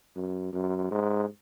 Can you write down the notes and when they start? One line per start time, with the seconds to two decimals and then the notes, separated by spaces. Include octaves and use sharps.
0.16 F#2
0.53 F#2
0.91 G#2